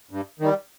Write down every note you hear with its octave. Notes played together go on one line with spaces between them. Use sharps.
G2
D#3 G3